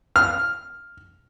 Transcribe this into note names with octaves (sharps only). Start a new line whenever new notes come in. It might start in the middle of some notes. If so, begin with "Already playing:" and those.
F6